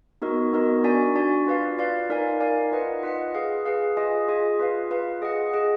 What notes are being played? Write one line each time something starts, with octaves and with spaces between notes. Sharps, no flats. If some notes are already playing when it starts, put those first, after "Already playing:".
B3 D#4 F#4 A#4 D#5
B3 D#4 F#4 A#4 D#5
D4 F#4 D5 G#5
D4 F#4 D5 G#5
F4 B4 D5 F5
F4 B4 D5 F5
D#4 A#4 D5 F5 G#5
D#4 A#4 D5 F5 G#5
F4 B4 D#5 F#5
F4 B4 D#5 F#5
G#4 B4 F5
G#4 B4 F5
F4 G#4 D#5 G#5
F4 G#4 D#5 G#5
F4 B4 F5
F4 B4 F5
G#4 D#5 F#5
G#4 D#5 F#5